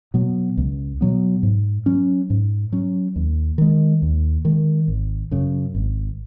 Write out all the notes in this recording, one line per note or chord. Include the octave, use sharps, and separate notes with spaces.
B2 F#3 B3
C#2
B2 F#3 B3
G#2
F#3 C#4
G#2
F#3 C#4
D#2
D#3 G#3
D#2
D#3 G#3
G#1
F#2 C#3
G#1